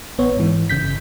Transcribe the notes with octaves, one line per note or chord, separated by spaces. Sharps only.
A1 B3 C#5
G#2 E3
G1 C#3 G6 B6